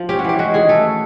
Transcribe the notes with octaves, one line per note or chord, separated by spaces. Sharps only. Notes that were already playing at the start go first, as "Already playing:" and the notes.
Already playing: F3
C#4 G4
F#4
E3 G4
G#3 F#4
D#3 G#4
A3 A4